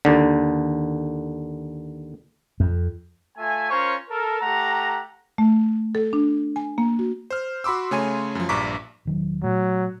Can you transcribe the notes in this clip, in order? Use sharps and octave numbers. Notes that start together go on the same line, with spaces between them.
D#2 D3
F2
A3 F4 E5 G#5
C#4 F4 A#4 C5 C#5
A4 A#4
A3 G4 F#5 A#5
A3
A4
D4
G#5
A#3
F#4
C5 F6
F#4 B5 C6 D6 E6
C#3 A3 C#5 G#5 C6 D#7
F#2 F3
A#1 G2 A#5 C#6 D6 B6
E1 D#3 F#3
A#2 F#3 A3